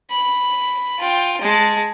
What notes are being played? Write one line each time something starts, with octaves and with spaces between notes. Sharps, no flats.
B5
F4 G5
G#3 A5